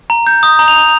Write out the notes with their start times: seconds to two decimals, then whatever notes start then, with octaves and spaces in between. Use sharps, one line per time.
0.10 A#5
0.27 G6
0.43 D#6
0.59 A#5
0.68 F7
0.76 A#5